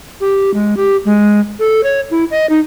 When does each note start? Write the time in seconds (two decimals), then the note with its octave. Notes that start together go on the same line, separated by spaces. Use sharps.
0.20 G4
0.54 G#3
0.77 G4
1.05 G#3
1.59 A4
1.84 C#5
2.11 E4
2.31 D#5
2.50 D#4